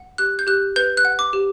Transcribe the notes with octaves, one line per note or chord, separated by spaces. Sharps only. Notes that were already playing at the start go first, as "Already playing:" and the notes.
Already playing: F#5
G4 F#6
G6
G4 F#6
B4 G6
F#6
F#5
D6
G4